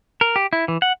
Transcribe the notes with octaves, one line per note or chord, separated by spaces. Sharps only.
A#4
G4
E4
E3
F#5